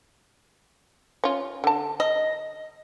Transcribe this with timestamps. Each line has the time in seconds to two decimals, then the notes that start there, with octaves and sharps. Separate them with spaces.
1.24 C#4 F4
1.64 D3 A5
2.00 D#5